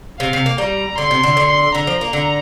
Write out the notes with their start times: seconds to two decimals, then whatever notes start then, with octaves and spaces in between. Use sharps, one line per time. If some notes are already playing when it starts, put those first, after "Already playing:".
0.20 C3 F5
0.33 C3
0.46 A#3
0.58 G3 A#5
0.97 D3 C6
1.11 C3
1.23 D3
1.37 D3
1.75 D3 A#5
1.87 F3
2.01 A#3
2.13 D3